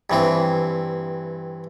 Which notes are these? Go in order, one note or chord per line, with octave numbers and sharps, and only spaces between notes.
G2 E3 C4